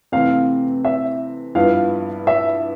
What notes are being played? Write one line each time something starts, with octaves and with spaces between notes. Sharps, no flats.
C3 E3 A3 C4 F5
E5
G2 F3 B3 E4 F5
E5